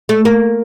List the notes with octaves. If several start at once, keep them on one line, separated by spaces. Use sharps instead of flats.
A3
A#3